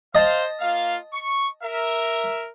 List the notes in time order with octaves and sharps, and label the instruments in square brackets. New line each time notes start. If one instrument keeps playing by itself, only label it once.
[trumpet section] C5 F5 [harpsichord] D#5 A5
[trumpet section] A#3 F4 F5
C#6
A#4 E5